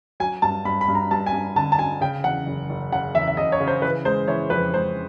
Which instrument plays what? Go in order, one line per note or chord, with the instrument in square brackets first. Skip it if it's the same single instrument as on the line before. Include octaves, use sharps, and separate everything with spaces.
[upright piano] F#3 G#5
G2 A5
G2 B5
B5
G2
A#5
G2 A5
G#5
G2
D3 A5
A5
D3 G#5
C#3 G5
E2 F#5
F#1
F#1
C#3 F#5
E2 E5
E5
C#3 D#5
C#5
C#3
C5
E3 B4
G#3 C5
E3 C#5
F2 B4
G#3 C5